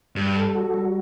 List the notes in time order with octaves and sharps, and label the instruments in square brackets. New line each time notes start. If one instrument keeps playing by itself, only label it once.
[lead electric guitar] G2 [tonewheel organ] G3
[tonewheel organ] A4
F#4
G3